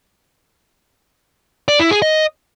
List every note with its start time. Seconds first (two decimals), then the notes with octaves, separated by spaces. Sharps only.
1.68 D5
1.80 E4
1.91 G#4
2.02 D#5